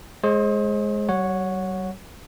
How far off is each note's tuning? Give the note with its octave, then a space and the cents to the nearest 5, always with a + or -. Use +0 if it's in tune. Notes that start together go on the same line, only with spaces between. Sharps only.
G#3 +10 C5 +35 D#6 +35
G3 -45 C#5 +0 F#5 -10